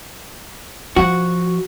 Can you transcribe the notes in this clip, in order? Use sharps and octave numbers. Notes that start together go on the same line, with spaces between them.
F3 F#4